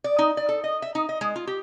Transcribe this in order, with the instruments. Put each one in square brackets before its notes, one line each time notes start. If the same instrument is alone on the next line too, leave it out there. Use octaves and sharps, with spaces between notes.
[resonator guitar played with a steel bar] D5
D#4
D5
A4
D#5
E5
D#4
D#5
G#3
F4
G4